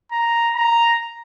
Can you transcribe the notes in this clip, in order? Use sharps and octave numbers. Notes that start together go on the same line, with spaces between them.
A#5
A#5